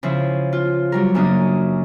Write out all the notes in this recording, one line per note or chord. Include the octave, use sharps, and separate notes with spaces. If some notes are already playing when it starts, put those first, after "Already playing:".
C#3 F3 E4
F4
F#3 G3 A#4
F#2 C#3 A#3 D4 D#6